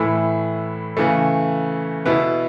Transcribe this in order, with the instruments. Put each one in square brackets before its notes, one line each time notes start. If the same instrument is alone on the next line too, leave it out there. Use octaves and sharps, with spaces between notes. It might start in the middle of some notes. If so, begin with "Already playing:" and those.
Already playing: [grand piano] A2 E3 A3 E4
C#3 E3 A3
B2 B3 E4